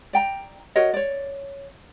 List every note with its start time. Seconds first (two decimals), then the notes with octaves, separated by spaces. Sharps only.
0.13 D5 G5 A#5
0.76 F#4 A#4 C#5 D#5
0.94 C#5 D5